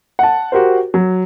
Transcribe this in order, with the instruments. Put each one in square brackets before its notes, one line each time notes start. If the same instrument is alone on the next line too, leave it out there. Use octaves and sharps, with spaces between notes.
[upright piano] F#5 A5
F#4 G4 A#4 C5
F#3